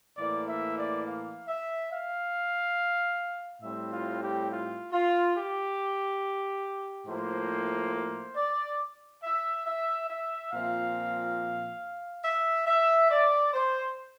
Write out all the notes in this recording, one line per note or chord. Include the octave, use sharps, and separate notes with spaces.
A2 E3 A#3 D5
E5
D5
F5
E5
F5
A2 G3 C4 E5
F4
G4
F4
F4
G4
A2 F3 A#3 C5
C5
D5
E5
E5
E5
A#2 F3 C4 F5
E5
E5
D5
C5